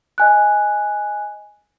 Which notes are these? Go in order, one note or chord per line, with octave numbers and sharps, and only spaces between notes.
D#5 G#5 F#6